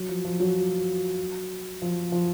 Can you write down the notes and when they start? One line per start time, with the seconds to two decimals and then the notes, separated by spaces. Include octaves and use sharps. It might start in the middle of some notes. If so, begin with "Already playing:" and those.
Already playing: F#3
0.09 F3
0.25 F3
0.40 F#3
1.82 F3
2.12 F3